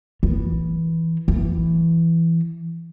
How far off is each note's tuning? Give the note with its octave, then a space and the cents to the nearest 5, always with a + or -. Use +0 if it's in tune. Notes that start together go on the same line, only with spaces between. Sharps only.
E3 -5
E3 +10